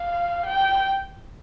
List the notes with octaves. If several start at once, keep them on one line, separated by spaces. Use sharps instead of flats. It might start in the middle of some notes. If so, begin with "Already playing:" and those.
Already playing: F5
G5